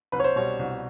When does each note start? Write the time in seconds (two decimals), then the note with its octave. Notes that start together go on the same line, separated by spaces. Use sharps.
0.12 C2 B4
0.19 C#5
0.24 C5
0.36 B2 G3 C#5
0.59 C2